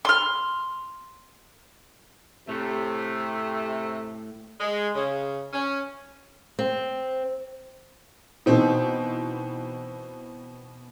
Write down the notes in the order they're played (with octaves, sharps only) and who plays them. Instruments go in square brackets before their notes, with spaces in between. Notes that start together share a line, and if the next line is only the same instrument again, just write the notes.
[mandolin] C6 F6
[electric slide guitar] A2 [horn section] C3 A3
[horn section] G#3
C#3
C#4
[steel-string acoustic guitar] C4
[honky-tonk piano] B2 E3 C4 D#4